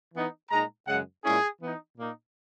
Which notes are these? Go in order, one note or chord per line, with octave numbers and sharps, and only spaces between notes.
E3 B3 D#4
A#2 G#3 D#4 A#5
F#2 C#3 G#3 F#5
A#2 G#3 C#4 E4 G#4
E3 B3 D#4
A#2 A#3 D#4